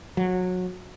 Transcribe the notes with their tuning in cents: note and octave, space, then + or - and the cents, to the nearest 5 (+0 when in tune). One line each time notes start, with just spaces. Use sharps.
F#3 -20